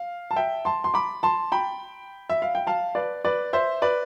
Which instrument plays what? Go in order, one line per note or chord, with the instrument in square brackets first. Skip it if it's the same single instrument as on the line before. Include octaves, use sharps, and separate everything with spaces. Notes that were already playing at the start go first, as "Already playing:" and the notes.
Already playing: [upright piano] F5
A5
E5 G5
A5 C6
C6
B5 D6
A5 C6
G5 B5
E5
F5
G5
F5 A5
B4 D5
B4 D5
C5 E5
B4 D5